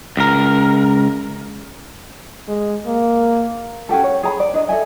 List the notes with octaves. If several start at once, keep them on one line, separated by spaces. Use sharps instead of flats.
C#2 A#4
G#3
A#3
C#4 F#4 G4 A4
C#5
G#4 A#5 B5
D5
D4 D#5
A4 D#5 E5 G#5